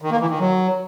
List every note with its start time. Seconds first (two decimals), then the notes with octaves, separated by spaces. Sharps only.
0.02 D#3
0.11 A#3
0.20 E3
0.30 D#3
0.39 F#3